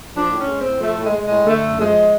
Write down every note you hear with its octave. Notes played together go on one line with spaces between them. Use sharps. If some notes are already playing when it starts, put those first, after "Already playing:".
F3 D4
A2
C#4
G#3
C4
A2
F3 A3
A2
G#3
G#3
G#3
A2
D3 A3
F#2
F3 G#3